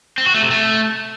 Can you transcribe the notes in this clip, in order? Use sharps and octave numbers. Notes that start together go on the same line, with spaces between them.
C4
F#4
A3
C3
A3